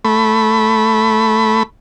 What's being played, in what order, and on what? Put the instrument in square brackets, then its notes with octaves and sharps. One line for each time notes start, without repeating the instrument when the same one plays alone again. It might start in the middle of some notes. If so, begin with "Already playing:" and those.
[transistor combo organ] A3 B5